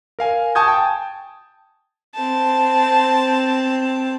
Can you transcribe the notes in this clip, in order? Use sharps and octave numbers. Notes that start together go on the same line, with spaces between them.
A#4 F5 G#5
G#5 A5 C#6 D#6 G6 G#6
G5 A5
C4 A5